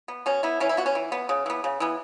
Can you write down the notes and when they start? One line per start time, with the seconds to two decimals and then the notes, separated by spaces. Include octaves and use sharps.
0.08 B3
0.26 B2 C#4
0.43 B3 E4
0.60 E3 C#4
0.69 E4
0.77 B3 F#4
0.86 C#4
0.95 E3
1.12 B3
1.29 C#3
1.46 E3 B3
1.64 C#3
1.80 E3 B3